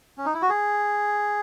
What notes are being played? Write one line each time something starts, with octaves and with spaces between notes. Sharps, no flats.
C#4
D#4
E4
F#4
G#4